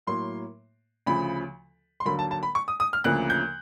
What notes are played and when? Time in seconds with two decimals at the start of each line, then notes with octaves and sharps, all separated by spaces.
0.07 A2 F#3 A#3 C6
1.06 D2 C#3 F3 B5
2.00 C6
2.05 D#2 D3 F#3 A#3 B5
2.19 A5
2.31 A5
2.43 B5
2.55 C#6
2.68 D#6
2.80 D#6
2.93 F6
3.04 D2 C#3 F3 A#3 F#6
3.30 G6